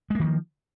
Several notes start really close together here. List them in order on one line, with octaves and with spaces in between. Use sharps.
G#3 A#3 D#3 F3